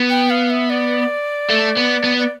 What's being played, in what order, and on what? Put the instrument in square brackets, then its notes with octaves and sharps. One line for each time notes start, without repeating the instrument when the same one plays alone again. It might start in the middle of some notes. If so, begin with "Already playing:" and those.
Already playing: [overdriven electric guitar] B3
[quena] G5
F5
E5
D5
[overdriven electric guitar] A3
B3
B3
[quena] D5